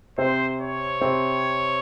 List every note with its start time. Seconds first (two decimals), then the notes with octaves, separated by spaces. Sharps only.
0.18 C3 C4 C5
0.60 C#5
1.01 C3 C4